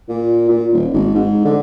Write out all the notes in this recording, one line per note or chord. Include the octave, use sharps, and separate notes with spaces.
A#2
A#2
D#1
G#1
G#2
D3